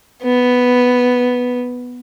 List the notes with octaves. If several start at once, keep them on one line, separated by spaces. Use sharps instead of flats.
B3